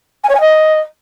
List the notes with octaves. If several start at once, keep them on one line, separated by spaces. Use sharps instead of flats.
G#5
C#5
G#5
D#5